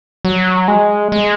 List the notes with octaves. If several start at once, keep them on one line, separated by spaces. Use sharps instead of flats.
F#3
G#3
G#3